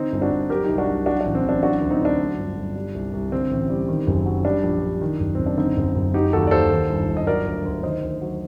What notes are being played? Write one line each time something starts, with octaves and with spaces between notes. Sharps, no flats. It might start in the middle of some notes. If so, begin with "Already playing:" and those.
Already playing: D3 C4 D#4
G1
D4 F#4
G1
F#3 G4 A#4
C2 D#4 G4
D4 F#4
C2
F#3 D4 F#4
A1 D4
C4
A1 D4
F#3 D4 F#4
D2
C4 D#4
D2 D4
F#3
G1
G1
G3
C2
C2
D3 C4
A1
G3
D#3
F#1
F#3
G3 D4
A#1
A#1
D#3
F#1
F#1 C4
D4
D3 C4 D#4
F#1
F#1
F#3 D#4 G4
D#2 F#4 A4
D5
D#2 A4 C5
D#3
G1
G1
D#5
F#3 A#4 D5
D2
D2
D#3 C5 D#5
D2
F#3